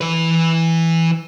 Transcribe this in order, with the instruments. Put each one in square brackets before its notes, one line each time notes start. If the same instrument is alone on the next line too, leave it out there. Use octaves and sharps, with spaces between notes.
[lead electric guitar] E3 B4